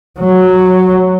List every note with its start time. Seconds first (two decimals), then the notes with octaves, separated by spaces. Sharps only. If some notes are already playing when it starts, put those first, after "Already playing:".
0.20 F#3